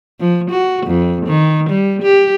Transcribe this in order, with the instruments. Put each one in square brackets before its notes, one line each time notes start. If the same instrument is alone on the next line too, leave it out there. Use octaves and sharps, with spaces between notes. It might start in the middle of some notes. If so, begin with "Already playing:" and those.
[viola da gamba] F3
F#4
F2
D#3
G3
G4